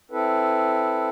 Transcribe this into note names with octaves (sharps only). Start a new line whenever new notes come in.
C4 E4 A4 B4